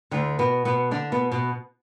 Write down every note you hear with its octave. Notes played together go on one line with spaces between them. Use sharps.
D2 D3
B2 B3
B2 B3
D3 D4
B2 B3
B2 B3